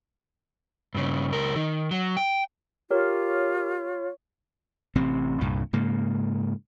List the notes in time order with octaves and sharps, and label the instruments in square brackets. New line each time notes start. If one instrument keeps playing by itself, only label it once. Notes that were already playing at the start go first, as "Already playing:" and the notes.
[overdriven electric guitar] G2 C#3
C#2 A#4
D#3
F#3
G5
[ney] F4 [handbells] G4 A#4 [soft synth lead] C#5
[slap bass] A1 C3 C4
C2 G2 A#2
G#2 C#3 A#3